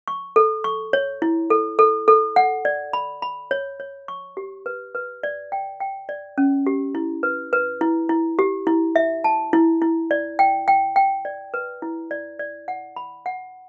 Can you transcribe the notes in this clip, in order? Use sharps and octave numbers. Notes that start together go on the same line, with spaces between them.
C#6
A4
C#6
C#5
E4
A4
A4
A4
F#5
D5
B5
B5
C#5
C#5
C#6
G4
B4
B4
D5
G5
G5
D5
C#4
G4
E4
B4
B4
E4
E4
G4
E4
E5
A5
E4
E4
D5
G5
G5
G5
D5
B4
E4
D5
D5
F#5
B5
F#5